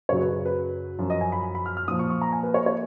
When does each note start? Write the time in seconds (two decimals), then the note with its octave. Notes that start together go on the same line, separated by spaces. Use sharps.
0.09 F#2 C#3 F#3 C#5
0.21 B4
0.46 B4
0.99 F#2 F3
1.10 D#5
1.21 G#5
1.32 B5
1.55 B5
1.66 F6
1.77 F6
1.88 A#2 F3 D#6
1.99 C#6
2.10 C#6
2.22 A#5
2.32 G#5
2.43 B4
2.54 C#5
2.66 C#5